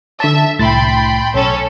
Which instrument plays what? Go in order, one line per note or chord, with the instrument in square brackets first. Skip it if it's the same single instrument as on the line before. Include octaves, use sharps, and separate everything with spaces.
[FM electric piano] D3 A5 [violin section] E5
[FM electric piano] C2 A2 A6 [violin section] G5 B5 C6
[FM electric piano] B1 [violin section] C#4 A4 C#5